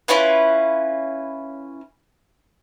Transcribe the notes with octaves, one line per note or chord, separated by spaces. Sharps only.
C#4 E4 F4 B4